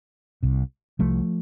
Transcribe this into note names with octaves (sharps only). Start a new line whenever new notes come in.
C2 C3
C2 C3 F3 A3